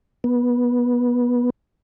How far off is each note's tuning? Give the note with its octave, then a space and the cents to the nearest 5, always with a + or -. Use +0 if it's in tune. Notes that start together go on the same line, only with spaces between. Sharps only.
B3 -20